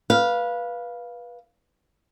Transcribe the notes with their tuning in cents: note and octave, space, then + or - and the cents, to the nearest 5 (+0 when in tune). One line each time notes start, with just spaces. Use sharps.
B4 -20 F5 +0